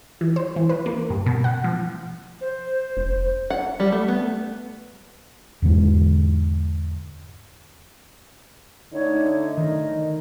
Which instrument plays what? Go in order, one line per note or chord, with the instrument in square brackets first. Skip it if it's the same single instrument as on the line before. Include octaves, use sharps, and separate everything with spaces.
[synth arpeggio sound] E3
C5
E3
B4
A#3
G2
B2
F#5
F3
[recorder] C5
[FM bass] F1
[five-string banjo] F#5
G3
A3
B3
[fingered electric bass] E2 G#2 D3 G#3
[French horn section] D3 A3 D#4 [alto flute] C#5
[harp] D#3 [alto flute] D#5